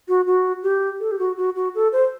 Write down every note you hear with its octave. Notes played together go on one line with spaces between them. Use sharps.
F#4
F#4
G4
A4
G4
F#4
F#4
F#4
A4
C5